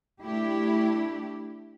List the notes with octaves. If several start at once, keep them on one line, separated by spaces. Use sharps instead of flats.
A3 D4 E4 G4